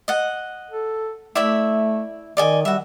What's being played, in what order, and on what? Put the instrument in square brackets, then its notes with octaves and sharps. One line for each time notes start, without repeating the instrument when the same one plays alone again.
[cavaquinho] D#5 F#5
[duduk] A4
[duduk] A3 [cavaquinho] E4 D5 E5
[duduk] D#3 [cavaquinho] D5 D#5 G#5
[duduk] G3 [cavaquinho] F#4 E5